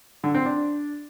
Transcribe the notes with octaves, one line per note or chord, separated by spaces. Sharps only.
D3
C4
D4